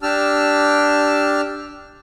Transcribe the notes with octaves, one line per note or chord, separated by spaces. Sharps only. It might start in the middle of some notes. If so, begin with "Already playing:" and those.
D4 G4 A5 E6 F6